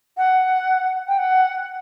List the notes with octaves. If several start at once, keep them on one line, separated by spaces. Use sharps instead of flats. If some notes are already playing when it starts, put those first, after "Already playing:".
F#5
G5
F#5